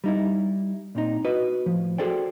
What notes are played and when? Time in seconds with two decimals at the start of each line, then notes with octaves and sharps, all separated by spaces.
0.04 G3 D#4 E4
0.95 A#2 C4 D#4
1.24 E4 F#4 B4 D#5
1.66 A2 F3
1.98 F#4 G#4 A4 C5 D5 G5